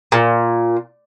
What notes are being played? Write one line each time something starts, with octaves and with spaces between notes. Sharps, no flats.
A#2